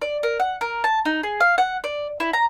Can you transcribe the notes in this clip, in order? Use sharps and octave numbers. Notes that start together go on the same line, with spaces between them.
D5
A#4
F#5
A#4
A5
D#4
G#4
F5
F#5
D5
E4
A#5